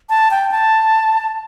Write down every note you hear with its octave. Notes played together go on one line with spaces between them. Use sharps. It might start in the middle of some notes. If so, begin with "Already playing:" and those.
A5
G5
A5